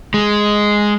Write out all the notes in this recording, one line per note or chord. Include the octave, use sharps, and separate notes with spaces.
G#3